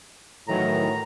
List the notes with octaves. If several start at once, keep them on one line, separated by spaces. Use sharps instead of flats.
A2 D#3 E3 F#3 A#5